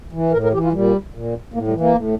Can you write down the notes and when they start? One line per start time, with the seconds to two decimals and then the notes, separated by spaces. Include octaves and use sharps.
0.12 E3
0.32 A2 A#4
0.43 A#4
0.52 E3 G4
0.64 F4
0.73 A#2 G3
1.14 A#2
1.54 A2 A#3
1.67 G3
1.73 E3
1.80 A#3
1.95 A2